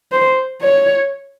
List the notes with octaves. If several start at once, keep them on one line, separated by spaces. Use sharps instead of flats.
C5
C#5